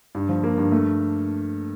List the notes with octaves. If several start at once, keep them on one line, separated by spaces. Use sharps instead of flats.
G2
F3
A#3
G2
A3